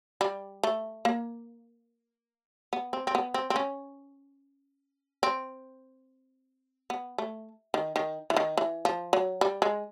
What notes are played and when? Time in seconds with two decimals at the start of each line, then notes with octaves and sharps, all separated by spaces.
0.21 G3
0.63 A3
1.05 A#3
2.73 B3
2.93 C4
3.07 C4
3.15 B3
3.34 C4
3.50 C4
3.56 C#4
5.23 C4
6.90 B3
7.18 A3
7.74 D#3
7.96 D#3
8.30 E3
8.36 D#3
8.57 E3
8.85 F3
9.13 F#3
9.41 G3
9.62 G#3